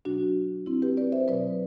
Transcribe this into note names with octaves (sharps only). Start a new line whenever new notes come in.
B2 F#3 D4 F#4
C4 E4
G4 B4
B4 D5
C5 E5
B2 F#3 B4 D5